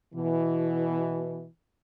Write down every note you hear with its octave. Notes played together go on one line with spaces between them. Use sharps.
B2 E3